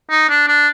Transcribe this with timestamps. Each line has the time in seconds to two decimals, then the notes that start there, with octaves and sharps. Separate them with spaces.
0.10 D#4
0.29 D4
0.48 D4